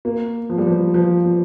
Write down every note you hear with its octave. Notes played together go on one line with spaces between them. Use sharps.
A#3
F3
G3
F3
F3
F3